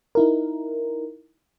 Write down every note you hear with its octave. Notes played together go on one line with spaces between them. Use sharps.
D#4 E4 A#4